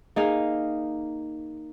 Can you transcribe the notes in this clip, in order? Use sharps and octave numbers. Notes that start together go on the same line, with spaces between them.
A#3 D#4 G#4 F5